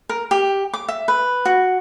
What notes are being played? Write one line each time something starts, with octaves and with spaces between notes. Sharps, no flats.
A#4
G4
D6
E5
B4
F#4